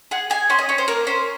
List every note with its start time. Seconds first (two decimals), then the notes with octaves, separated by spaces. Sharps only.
0.11 G#4 F#5
0.30 G#4 G#5
0.50 C#4 C6
0.59 D#5
0.69 C#4 C#5
0.78 C5
0.88 A#3 A#4
1.07 C#4 C5